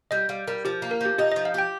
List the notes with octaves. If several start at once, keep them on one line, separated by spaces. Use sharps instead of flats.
G3 D#5
G3 F5
G3 A#4
F3 G4
A#3
A#4
F3 G4
D#4 G4
D#5
F3
F5
G4 G5